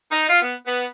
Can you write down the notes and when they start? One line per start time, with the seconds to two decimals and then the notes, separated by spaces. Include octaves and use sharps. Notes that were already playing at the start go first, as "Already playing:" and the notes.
0.11 D#4
0.29 F4
0.42 B3
0.66 B3